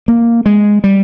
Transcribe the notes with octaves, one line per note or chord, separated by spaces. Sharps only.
A#3
G#3
G3